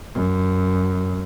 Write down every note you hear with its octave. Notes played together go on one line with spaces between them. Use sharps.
F#2